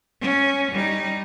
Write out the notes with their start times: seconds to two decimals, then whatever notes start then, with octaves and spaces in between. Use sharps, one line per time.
0.21 C#4
0.72 G3 D#4